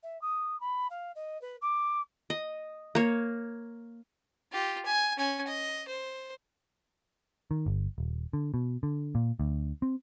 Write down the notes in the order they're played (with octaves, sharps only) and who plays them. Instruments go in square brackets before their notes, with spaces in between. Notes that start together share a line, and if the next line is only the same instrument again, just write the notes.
[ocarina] E5
D#6
B5
F5
D#5
B4
D6
[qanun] D#5
A#3 C#5
[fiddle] F4 G4
G#5
C#4 G#5
D#5
C5
[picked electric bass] D#3
G1
D#1
D3
B2
D3
A#2
D2
C4